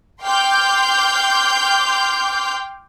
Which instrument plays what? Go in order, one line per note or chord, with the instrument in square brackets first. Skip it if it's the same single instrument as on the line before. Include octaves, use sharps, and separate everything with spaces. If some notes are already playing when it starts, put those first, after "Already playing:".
[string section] G5 C6 D6 F6 G6